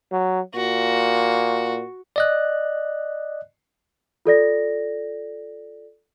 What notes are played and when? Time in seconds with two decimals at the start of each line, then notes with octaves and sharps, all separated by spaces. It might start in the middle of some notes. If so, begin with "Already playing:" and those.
0.12 F#3
0.55 A#2 F#4
2.16 D5 D#5 F#6
4.25 F4 A4 D5 A#6